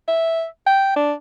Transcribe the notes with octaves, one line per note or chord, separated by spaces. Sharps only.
E5
G5
D4